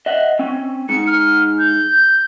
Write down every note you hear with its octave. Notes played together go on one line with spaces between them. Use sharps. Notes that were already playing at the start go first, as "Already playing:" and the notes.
D#5 E5 F#5
C4 C#4
G#2 C#7
F6
G6